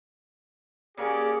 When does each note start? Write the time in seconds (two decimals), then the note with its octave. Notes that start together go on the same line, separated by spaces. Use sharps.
0.97 C#3 A#3 C#4 G4 G#4 D5